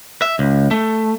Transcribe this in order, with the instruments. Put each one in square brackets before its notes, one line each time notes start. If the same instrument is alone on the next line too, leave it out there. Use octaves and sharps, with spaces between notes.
[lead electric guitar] E5
C#2
A3